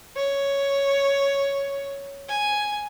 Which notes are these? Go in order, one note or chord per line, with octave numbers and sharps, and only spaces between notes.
C#5
G#5